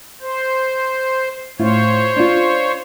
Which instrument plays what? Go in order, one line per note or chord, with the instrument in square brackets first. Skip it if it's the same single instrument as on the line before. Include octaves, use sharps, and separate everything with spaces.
[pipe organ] C5
[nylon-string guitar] A2 E4 F4 [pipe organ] C5 C#5
[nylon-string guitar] D4 F4